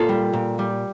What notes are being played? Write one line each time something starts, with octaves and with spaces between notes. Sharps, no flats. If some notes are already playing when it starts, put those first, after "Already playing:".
Already playing: A#2 F4 A4
G3
A#2
G3